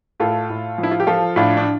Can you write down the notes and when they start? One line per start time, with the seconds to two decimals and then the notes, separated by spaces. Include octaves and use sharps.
0.20 A2 F4 A4
0.50 A2
0.78 F3
0.83 E4
0.91 F4
1.00 G4
1.07 F3 F4 A4
1.36 A2 D4 F4
1.57 D4